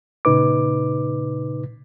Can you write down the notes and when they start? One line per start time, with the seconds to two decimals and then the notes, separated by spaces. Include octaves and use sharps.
0.25 A#2 C#3 D#4 B4 D6